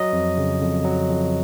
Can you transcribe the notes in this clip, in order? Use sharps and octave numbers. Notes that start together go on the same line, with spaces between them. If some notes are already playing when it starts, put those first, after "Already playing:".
Already playing: F#3 D#5
F2
C#3
F2
F#3
F2